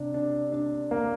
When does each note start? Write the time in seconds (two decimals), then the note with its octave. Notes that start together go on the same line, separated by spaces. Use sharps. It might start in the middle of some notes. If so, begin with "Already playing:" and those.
Already playing: C3 D4
0.14 D4
0.52 D4
0.91 A#3